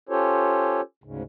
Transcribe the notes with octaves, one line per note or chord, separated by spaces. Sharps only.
C#4 F4 G4 A4 C5 C#5
D2 G#2 C#3